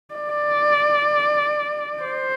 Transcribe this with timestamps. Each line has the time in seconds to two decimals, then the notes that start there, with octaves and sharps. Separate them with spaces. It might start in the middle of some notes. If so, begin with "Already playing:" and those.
0.14 D5
2.03 C5